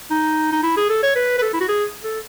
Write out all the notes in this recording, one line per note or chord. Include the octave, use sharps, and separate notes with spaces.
D#4
D#4
E4
G#4
A4
C#5
B4
B4
A4
E4
F#4
G#4
A4